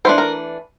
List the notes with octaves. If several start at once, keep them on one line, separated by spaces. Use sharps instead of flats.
E3 A3 D4 C5
A#4